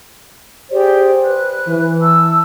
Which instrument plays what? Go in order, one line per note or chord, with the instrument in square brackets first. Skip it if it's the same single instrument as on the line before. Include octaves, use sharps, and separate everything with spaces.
[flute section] G4 G#4 D5 [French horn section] C5
[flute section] B4 F#6
[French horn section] E3
[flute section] A5 E6